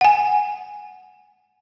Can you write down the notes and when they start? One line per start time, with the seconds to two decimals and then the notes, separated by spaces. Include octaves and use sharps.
0.01 F#5 G#5